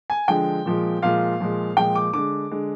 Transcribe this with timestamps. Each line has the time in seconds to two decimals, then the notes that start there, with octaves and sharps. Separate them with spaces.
0.10 G#5
0.28 D3 F3 G#3 G5
0.65 A#2 F3 G#3
1.02 A#2 F3 G#3 F5
1.40 A#2 F3 G#3
1.77 A#2 F3 G#3 G5
1.95 D6
2.13 D3 G#3 D6
2.51 D3 G#3